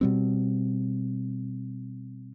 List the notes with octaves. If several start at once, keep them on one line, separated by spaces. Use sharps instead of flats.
B2 G3 C4